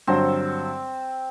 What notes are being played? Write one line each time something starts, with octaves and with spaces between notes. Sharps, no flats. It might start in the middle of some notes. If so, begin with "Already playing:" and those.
G2 D3 F#3 C4